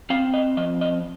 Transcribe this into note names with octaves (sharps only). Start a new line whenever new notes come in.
C4 F5
D#5
F3 D#5
D#5